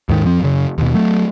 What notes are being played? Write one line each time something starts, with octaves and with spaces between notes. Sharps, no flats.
D#2 G#2 D#3
F2 F3 C4
F#2 C#3
D#2 B2
F#3 A3